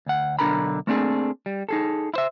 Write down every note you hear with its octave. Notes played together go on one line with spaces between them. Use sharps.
D2 F#5
B1 D3 D4 A#4 A#5 B5
A3 A#3 C4 D4 F#4 G#4
G3
D#4 G#4 A4
E4 C5 E5